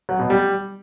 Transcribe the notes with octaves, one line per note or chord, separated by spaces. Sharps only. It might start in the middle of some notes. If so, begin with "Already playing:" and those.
F#3
B2
G3